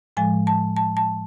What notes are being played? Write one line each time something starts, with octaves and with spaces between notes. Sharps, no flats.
A2 F3 G#3 G#5
A5
A5
A5